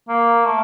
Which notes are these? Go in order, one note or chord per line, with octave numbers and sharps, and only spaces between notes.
A#3
A3